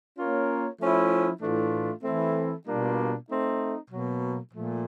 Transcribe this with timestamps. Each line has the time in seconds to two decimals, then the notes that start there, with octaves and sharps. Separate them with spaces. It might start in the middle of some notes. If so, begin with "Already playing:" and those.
0.18 A#3 C#4 F4 A#4 C#5
0.80 F3 A3 C#4 E4
1.41 A2 E3 A3 D4 F4
2.04 E3 A3 C4 E4 A4
2.66 B2 G3 A#3 D4 F4
3.27 A3 C4 D#4
3.89 B2 F#3 A#3
4.51 A#2 F3 A3